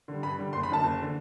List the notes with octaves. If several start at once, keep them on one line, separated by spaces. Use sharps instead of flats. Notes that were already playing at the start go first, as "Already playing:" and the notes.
D3 G3
G2 B5
D3 G3
F#1 C6
B5
F#2 D3 A5
F#1
D3